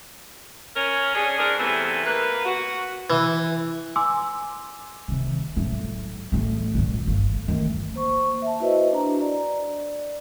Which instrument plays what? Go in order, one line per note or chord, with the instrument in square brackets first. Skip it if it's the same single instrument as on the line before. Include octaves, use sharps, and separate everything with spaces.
[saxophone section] C#4 A#4
C#4 D4 G#4
G#2 D4 A#4
C3 E3 A3 B3
A#3 B4
F#4
[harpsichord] E3
[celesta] G#5 C6 D6 E6
[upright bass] C3 D#3
A2 F#3
A1 A2
A#1 F#3
G1
D#3 A3
[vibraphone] A#3 C5 C#6
E5 A5
E4 F#4 B4 C5 D#5
D4 A#5
D5